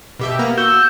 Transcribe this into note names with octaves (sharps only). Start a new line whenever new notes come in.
B2 G4 E5
A#3 B3 A#5
F#4 E6 G6